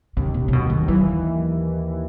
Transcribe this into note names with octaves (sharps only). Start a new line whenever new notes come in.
D#2 C#3
B2
C#3
D#2 B2
D#3
E3 F#3